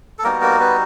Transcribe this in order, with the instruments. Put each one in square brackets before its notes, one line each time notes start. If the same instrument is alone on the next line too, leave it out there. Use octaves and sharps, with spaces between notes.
[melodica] A4
G3 A#3 B3 D#4 F#4 A#4
A#3 A#4
B3 B4